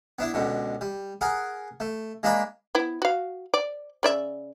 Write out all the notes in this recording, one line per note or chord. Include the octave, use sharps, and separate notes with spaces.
B3 D4 E4
C#2 B2 D3
G3
G#4 A#4 F#5
A3
G#3 A#3 D4 D5 A#5 B5
B3 E4
F#4 F5
D5
C#3 D5 E5